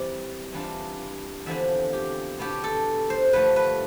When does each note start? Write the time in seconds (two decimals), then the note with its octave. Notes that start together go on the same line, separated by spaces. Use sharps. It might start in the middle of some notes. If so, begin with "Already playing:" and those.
Already playing: E3 G3 C4 D5
0.53 E3 G3 D4 F4
1.46 E2 D3 F3 C4 E4 E5
1.93 G4
2.39 B2 B3 D4 G4
2.64 A4
3.10 C5
3.33 G2 D3 F3 A3 B4
3.56 B4